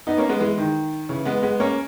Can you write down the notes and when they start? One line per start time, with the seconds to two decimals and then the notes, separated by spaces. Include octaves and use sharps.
0.07 B3 D#4
0.18 A#3 C#4
0.29 G#3 B3
0.40 E3 G#3
0.58 D#3
1.09 C#3 E3
1.25 G#3 B3
1.42 G#3 B3
1.60 A#3 C#4